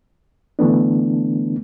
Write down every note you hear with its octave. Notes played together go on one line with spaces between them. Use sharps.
D3 E3 A3 B3 D4